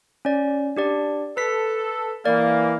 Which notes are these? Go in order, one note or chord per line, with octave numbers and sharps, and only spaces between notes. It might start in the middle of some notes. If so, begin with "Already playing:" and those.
C#4 D5
D4 G4 D5
A4 B4 B6
E3 A#3 D5